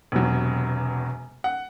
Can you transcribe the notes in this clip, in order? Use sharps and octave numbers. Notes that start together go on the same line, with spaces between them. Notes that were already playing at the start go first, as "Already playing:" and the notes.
E1 E2 C3 F#3
F#5